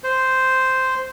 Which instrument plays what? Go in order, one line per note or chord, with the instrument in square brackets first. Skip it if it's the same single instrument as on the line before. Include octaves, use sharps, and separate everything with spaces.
[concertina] C5